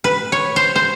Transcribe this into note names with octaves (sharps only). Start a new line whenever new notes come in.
B4
C#5
C5
C5